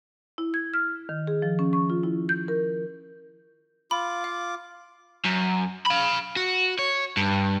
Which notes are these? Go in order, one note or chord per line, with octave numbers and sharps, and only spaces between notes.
E4
G#6
F6
D#3
G#4
F3
C#4
C#6
F4
E4
G6
A#4
F4 B5 D6
F5
F#2
F5 B5
F#4
C#5
G2